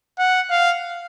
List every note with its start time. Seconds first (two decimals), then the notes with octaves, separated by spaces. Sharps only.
0.19 F#5
0.50 F5